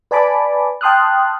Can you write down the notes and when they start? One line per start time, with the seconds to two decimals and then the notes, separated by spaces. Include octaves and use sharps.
0.11 B4 D5 G#5 A5 B5 D6
0.81 G5 A5 C6 D#6 F6 F#6